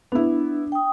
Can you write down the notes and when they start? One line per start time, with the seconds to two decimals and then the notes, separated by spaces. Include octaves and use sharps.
0.12 B3 D4 E4
0.72 G5 D#6